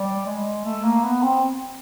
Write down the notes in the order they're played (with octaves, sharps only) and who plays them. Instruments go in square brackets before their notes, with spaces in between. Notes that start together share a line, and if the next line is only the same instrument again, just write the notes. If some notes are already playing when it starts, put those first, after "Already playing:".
Already playing: [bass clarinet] G3
G#3
A3
A#3
B3
C4